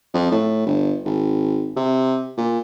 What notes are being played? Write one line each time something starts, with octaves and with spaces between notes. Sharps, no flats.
F2
A2
G1
G#1
C3
A#2